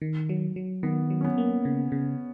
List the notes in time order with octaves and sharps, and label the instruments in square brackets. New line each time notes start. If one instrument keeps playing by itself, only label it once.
[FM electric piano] D#3
F#3
F#3
[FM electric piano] D#3 [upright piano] B3
[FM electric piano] F#3
[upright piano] C#4
B3
[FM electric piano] A#3
C#3
C#3